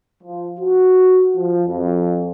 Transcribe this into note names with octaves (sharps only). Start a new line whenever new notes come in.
F3
F#4
F3
F2